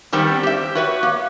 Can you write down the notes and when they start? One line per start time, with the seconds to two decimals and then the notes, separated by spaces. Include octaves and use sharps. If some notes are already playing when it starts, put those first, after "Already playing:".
0.12 D#3 G3 B3 C4 D4
0.43 G4 E5
0.75 F#4 B4 C#5
1.03 A#3